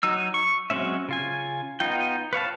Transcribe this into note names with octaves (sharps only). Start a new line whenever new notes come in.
F#3 D#4 E6
C#6
F#3 G#3 C4 C#4 E5
C#3 F4 G#5
B3 D#4 F4 G5
B4 C#5 F5 A5